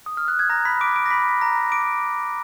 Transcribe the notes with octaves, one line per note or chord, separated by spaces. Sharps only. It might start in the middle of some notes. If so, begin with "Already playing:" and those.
D#6
F6
F#6
G#6
A#5 A#6
B5 B6
D6 D7
D6 D7
A#6
B5 B6
A#5 A#6
D6 D7